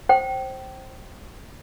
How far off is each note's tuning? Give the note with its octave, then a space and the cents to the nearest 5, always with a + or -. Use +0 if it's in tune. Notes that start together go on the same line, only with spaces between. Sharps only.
C5 +15 G5 -25